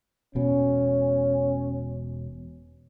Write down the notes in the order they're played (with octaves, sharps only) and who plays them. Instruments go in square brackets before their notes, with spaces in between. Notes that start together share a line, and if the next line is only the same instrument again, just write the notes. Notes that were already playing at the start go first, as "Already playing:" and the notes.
[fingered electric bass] E1 B2 [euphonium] C#4